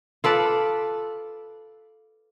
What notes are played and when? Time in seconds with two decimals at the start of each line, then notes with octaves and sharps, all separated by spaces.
0.24 F4 A4 B4 D5